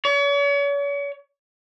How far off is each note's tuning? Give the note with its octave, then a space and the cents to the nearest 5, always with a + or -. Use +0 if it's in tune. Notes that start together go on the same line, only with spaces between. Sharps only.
C#5 +40